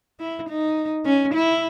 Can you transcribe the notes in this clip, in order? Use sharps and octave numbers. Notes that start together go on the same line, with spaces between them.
E4
D#4
C#4
E4